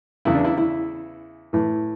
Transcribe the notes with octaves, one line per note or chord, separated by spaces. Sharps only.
E2 C#3 E3 E4
D4
E4
E4
A2 E3